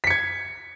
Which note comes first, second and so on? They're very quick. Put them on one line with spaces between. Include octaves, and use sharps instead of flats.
B6 C#7 G#6